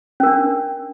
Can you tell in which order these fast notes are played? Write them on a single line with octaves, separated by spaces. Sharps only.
C#4 A#4 D4